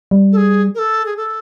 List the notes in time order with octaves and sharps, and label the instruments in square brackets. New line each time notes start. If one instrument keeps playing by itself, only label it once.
[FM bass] G3
[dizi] A4
G#4
A#4
A4
G#4
A4